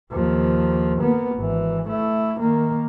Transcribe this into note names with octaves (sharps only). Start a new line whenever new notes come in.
D#2 F3
A#3 B3
G#1 E3
A3 E4
D#3 A#3